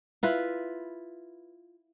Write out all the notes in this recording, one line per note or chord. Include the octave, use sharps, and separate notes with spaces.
E4 F4 B4